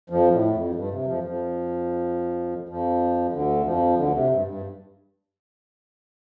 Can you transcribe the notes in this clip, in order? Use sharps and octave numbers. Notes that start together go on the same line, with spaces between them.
F2 F3
A2
F2
G2
C3
F2 F3
F2 F3
F2 F3
D2 D3
F2 F3
D2 D3
C3
G2
G2